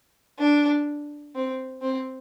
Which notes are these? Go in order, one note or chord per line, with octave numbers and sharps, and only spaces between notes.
D4
C4
C4